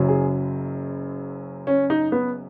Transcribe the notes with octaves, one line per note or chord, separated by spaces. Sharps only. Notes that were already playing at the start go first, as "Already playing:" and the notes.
Already playing: F#1 F#2 C#3 F#3
G#4
C#4
D#4
B3